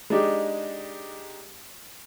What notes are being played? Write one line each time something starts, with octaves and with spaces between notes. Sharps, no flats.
G#3 D4 D#4 G4